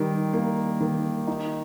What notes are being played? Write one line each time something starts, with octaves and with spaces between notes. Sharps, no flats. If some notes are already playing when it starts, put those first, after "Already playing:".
Already playing: D#3 G3
A#3
D#3
D#4